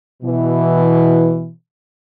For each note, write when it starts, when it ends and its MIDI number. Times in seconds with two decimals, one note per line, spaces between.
0.23 1.51 47
0.23 1.51 52